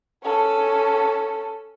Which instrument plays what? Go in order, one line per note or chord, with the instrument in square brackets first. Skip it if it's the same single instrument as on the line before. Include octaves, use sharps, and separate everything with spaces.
[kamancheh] C#4 A4